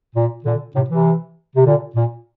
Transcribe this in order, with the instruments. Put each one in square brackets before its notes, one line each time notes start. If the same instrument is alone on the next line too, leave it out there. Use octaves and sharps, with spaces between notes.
[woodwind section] A#2
A#2 D3
A2 C3
C3 E3
C3
A#2 D3
A#2